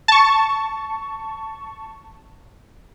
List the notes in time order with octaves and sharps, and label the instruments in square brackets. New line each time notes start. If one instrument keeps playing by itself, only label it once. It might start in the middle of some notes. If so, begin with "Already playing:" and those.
[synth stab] A5 C#6